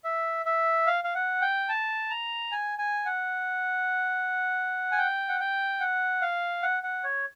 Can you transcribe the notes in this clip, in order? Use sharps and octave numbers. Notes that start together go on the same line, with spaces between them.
E5
E5
F5
F5
F#5
G5
A5
A#5
G#5
G#5
F#5
G#5
G5
F#5
G5
F#5
F5
F#5
F#5
C#5